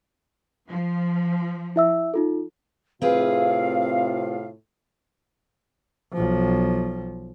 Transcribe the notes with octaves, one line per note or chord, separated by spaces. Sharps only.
F3
E4 E5 E6
D#4 F4 A4
A2 C3 C4 F4 G#4 B4 F5
B1 F3